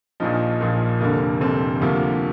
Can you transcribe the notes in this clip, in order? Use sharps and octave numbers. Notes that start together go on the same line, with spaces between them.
A#1 A#2 F3 D#4
A#1 A#2 F3
F1 F2 D3 A#3
F1 F2 D3 C4
D2 C3 F3 A#3